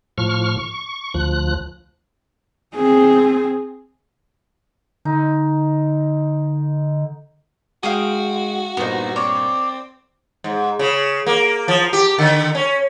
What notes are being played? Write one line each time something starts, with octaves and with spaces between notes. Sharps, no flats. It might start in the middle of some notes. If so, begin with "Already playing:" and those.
A2 F3 C#6 F6
C#6
D2 F3 F#6
C4 G#4
D3 D#4
G#3 F#4 F5 G5 D#6 D#7
G2 A#2 B3 D#4 C5
C4 C#5 D5
G#2
C#3
A#3
F3
G4
D3
C#4